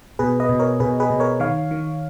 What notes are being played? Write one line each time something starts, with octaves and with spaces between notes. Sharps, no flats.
B2 G#4 B4
B4 D#5
B2
A#4 C#5
B2 G#4 B4
G#4 B4
B2
A#4 C#5
D#3 C#5 F5
D#3